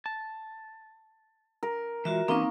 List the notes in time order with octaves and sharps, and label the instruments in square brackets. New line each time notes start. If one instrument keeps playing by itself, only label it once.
[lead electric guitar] A5
[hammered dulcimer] A#4
[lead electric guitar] E3 G#3 [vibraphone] F4 F#4 E5
[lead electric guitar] E3 C#4 [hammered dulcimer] A#3 [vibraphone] C4 D#4 C#6